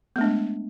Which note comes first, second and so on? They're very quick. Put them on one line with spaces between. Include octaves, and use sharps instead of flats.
B3 A3 D4 G#3